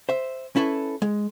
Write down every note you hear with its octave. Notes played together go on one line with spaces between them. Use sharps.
C5 E5
C#4 E4 A4 B4
G#3